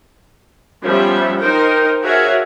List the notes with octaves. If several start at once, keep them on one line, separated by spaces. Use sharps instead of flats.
F3 G3 B3 C#4 E5
D#4 A#4 C5 G5
F#4 G#4 A#4 C#5 E5 F5